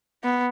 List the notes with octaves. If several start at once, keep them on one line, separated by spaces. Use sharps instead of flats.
B3